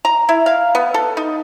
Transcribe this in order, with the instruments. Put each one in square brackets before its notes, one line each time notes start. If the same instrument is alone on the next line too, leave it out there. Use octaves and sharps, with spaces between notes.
[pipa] A#5
E4
F5
B3
A4
D#4